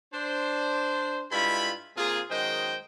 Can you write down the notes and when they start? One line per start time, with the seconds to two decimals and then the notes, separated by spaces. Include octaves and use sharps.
0.13 D4 C5
1.32 G2 G#3 E4 F4 B5
1.97 C3 A#3 F4 G#4
2.30 F#2 D#3 G#3 C5 D#5 G5